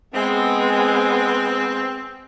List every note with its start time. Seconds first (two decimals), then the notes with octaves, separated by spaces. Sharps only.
0.14 G#3 B3 C4